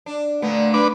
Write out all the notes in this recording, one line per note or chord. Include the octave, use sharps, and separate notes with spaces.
D4
A#2 D3 A3 B3
D4 B4 D6